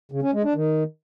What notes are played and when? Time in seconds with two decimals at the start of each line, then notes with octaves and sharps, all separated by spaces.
0.11 C#3
0.22 C#4
0.33 G#3
0.44 D4
0.55 D#3